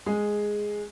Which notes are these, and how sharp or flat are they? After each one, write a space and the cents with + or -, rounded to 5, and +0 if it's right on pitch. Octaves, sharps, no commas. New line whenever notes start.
G#3 +0 G#4 +0